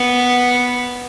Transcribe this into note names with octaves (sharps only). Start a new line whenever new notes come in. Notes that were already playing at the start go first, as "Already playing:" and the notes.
Already playing: B3